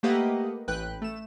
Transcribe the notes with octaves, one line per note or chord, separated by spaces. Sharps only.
A3 A#3 G4 B4 D#5 F#5
A1 B4 G5 F#6
A3 E7